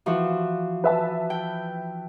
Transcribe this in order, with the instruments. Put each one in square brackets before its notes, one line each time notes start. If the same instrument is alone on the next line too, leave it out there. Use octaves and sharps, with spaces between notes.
[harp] E3 F3 F#4
[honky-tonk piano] B4 E5 A5
[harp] G5